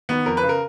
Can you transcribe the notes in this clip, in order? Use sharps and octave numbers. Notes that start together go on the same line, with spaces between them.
D#3 B3
F2 A#4
B4
C#3
A#4